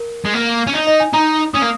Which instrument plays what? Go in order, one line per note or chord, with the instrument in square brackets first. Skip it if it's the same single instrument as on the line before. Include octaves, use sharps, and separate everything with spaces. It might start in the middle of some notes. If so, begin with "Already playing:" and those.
Already playing: [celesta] A#4
[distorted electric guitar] G#3
A#3
C#4
D#4
[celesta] D#5
G#5
[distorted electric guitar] D#4 [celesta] A#5
[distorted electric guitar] C#4 [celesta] D#6
[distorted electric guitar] A#3